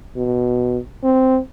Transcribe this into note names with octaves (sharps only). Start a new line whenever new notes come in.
B2
C4